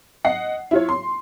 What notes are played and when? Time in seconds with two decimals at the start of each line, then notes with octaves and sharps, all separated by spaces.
0.25 D#5 F#5 C7
0.71 E4 F4 C#5
0.89 C6